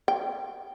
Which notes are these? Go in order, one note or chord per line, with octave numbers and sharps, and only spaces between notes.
G5